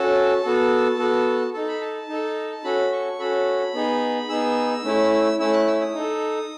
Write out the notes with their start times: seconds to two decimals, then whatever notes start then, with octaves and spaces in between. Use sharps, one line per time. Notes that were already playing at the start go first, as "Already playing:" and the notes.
Already playing: C#4 F#4 A4 A5
0.44 B3 F#4 A4
0.98 B3 F#4 A4
1.54 D#4 A4 A5
1.68 B5
1.81 A5
2.09 D#4 A4
2.64 C#4 F#4 A4 B5
2.92 C#6
3.19 C#4 F#4 A4 B5
3.74 B3 D#4 G#4
4.29 B3 D#4 G#4 E6
4.84 A3 C#4 E4
5.39 A3 C#4 E4 E6
5.53 F#6
5.67 E6
5.81 D#6
5.95 D#4 A4